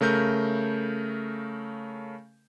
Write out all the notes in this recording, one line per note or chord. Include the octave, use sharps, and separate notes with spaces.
C#3 A3 A#4 G6